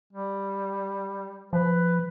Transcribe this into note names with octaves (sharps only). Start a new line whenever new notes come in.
G3
F3 B4